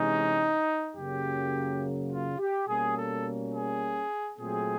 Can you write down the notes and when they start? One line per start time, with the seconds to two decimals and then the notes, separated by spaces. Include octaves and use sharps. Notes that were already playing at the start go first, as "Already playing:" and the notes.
Already playing: C3 E3 G#3 C#4 D#4
0.96 F#2 C#3 F#3 A#3 G4
2.11 F4
2.39 G4
2.67 B2 G3 A#3 C#4 G#4
2.96 A4
3.53 G#4
4.38 A#2 F#3 A3 C4 G#4